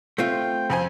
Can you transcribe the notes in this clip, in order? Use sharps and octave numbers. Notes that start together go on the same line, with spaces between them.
A3 C4 F4 G5
F2 C4 G#5